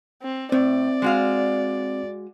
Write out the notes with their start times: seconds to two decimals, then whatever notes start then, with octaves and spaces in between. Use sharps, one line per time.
0.22 C4
0.52 A2 C4 D5
1.02 G#3 F#4 F5